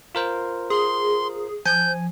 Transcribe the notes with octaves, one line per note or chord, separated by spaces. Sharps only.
F4 A#4 C5
G#4 C6
F3 G#5 G6